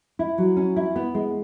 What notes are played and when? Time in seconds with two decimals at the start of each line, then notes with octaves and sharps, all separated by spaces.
0.19 E4
0.38 F#3
0.57 C#4
0.76 E4
0.96 B3
1.14 G#3